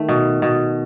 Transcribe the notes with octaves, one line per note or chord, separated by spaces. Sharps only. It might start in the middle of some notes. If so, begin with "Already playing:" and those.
Already playing: D#3 A3
B2
B2